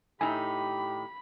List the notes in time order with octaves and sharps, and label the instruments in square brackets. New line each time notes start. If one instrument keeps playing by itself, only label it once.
[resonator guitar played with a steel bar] A2 D#4 [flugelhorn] G4 [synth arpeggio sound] G#5 E6 [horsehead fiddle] B5